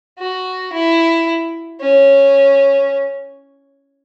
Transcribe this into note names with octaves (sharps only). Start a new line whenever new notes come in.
F#4
E4
C#4